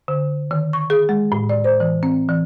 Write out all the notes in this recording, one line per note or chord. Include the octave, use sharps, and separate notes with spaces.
D3
D#3
C#6
G#4
G#3
A2
D5
C5
E3
C4
E3